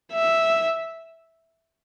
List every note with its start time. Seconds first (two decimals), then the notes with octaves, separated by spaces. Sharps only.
0.13 E5